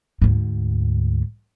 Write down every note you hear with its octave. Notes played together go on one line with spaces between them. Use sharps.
D2 G#2